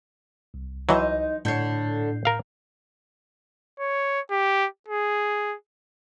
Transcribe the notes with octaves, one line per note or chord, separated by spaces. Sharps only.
C2
E3 F#3 D#4 C5
A2 D3 C#5 G6 C7
A#4 F5
C#5
G4
G#4